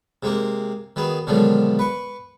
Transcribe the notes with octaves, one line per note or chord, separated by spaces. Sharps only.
C3 G#3 A#3 C4
D#3 F#3 B3 G#4
B2 D3 D#3 F3 F#3 G#3
B4 C#6